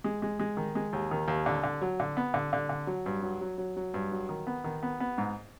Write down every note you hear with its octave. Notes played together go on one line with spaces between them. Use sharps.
G#3
G#3
G#3
D#3
G#3
D#2
D#3
D#2
D3
D3
F#3
D3
B3
D3
D3
D3
F#3
G2
F#3
F#3
F#3
F#3
G2
F#3
D#3
B3
D#3
B3
B3
G#2